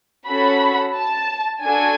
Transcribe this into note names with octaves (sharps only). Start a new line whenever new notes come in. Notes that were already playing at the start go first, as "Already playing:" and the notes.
C#4 F#4 A4 B5
A5
D4 F#4 A4 G#5